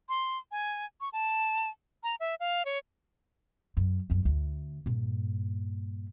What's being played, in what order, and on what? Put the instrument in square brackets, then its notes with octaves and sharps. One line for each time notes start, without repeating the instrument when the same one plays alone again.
[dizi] C6
G#5
C#6
A5
A#5
E5
F5
C#5
[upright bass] F#2
G1 F#2
D2
G2 A#2